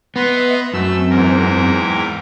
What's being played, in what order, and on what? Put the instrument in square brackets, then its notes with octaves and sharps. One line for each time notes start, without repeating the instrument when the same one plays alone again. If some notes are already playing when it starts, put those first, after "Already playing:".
[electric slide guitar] B3 [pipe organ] B4 A#5 C6 [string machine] D#5 E5
[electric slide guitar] F#2 [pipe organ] A3 E6 [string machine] C4
[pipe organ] E2 G#2 A#4
[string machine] G5 D6